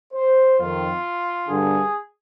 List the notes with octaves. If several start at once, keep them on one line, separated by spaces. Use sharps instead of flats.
C5
F2 D#3 F4
G2 D3 G#4